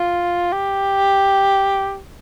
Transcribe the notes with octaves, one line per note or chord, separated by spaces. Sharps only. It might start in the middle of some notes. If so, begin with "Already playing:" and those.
Already playing: F4
G4